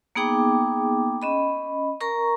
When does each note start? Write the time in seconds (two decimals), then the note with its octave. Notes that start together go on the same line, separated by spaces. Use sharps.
0.15 A#3 B3 D#4 G#4 G5 D6
1.22 C#4 D#5 B5
2.01 A#4 A#5 C#6